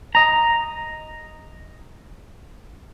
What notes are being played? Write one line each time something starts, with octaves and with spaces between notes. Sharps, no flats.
D#5 A#5